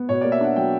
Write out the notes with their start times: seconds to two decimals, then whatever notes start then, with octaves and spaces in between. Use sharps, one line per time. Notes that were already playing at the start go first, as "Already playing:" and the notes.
Already playing: B3
0.09 B2 C#5
0.21 A#3 D5
0.32 E5
0.41 D4 F#5
0.56 F#3 G5